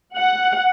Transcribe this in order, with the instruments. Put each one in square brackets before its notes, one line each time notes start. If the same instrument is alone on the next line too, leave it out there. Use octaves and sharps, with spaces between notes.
[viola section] F#5